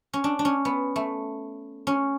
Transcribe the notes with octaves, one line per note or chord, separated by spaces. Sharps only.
C#4
D4
D4
C#4
B3
A3
C#4